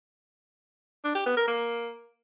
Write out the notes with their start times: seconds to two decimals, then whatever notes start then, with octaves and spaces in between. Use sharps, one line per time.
1.04 D4
1.15 G4
1.26 B3
1.37 A#4
1.48 A#3